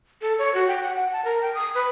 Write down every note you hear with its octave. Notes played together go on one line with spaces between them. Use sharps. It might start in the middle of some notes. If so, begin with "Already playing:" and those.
A4
C#5
F#4
G5
F#5
F#5
A5
A#4
G5
D#6
B4